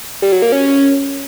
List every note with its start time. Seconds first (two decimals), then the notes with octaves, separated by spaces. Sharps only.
0.22 G3
0.32 F#3
0.42 A#3
0.52 C#4